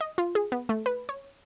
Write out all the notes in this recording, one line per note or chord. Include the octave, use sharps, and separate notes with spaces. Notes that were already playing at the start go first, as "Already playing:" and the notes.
D#5
F4
G#4
B3
A3
B4
C#5